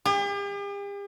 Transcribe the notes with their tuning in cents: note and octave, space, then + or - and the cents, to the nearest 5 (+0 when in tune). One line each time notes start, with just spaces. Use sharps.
G4 +45